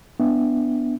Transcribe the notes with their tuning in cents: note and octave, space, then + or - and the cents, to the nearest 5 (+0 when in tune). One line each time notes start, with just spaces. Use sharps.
B3 +0 D4 +0 E5 +0